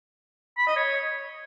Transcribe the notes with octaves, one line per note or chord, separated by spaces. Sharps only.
B5
D#5
C#5